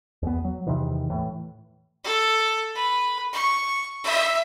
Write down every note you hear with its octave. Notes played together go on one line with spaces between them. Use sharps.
E2 B3
F#3
E2 C3 D#3 E3
A2 E3
A4
B4
C#6
E5